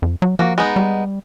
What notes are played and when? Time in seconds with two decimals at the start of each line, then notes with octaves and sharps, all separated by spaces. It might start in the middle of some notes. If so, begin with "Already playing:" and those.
0.02 F2
0.22 F#3
0.39 F3 A#3 F#4
0.58 G#3 B3 D#4
0.76 G3